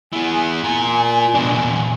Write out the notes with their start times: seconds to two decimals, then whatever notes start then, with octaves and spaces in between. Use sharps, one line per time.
0.13 E3 B3 G#5
0.64 F4 A#4
1.34 B2 D4
1.52 E2 A#2